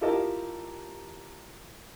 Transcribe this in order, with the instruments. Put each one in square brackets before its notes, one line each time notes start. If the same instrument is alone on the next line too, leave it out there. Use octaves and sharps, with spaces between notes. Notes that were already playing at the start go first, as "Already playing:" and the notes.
[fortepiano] E4 F4 G4 A#4 D#5 A5